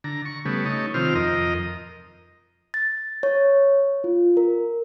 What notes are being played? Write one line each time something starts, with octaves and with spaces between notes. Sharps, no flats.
D3 A#5
C#6
C#3 G3 A3 B3
A3 D#4 C#5
C3 D#3 F3 C4 F6
F2 A#4 D#5
A6
C#5
F4
A#4